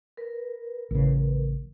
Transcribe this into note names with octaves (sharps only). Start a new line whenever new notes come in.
A#4 B4
A1 C#3